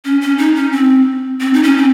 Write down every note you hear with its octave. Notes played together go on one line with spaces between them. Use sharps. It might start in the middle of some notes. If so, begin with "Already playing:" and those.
C#4
C#4
D#4
C#4
C4
C4
D#4
C#4
C4